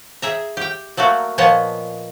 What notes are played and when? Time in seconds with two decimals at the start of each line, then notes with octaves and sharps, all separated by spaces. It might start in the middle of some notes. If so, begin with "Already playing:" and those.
0.22 G#4 E5 A#5
0.57 G4 G5
0.97 F#3 A3 A#3 F#4
1.38 A#2 F3 B3 C#5 D#5 A5